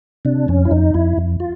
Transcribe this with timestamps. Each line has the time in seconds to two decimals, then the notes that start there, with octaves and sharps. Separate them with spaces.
0.25 C3 D4
0.48 F2 C#4
0.65 E4
0.71 F2 D#4
0.94 F2 E4
1.17 F2
1.40 F4